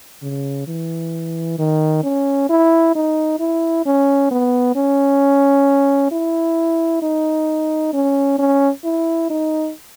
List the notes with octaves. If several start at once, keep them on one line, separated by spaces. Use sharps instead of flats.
C#3
E3
D#3
C#4
E4
D#4
E4
C#4
B3
C#4
E4
D#4
C#4
C#4
E4
D#4